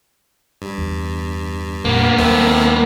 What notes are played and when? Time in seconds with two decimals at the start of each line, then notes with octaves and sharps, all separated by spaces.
0.62 G2
0.78 E2
1.85 F2 A#2 A#3 B3 D4
2.18 D#2 D#3 F#3 A3 C4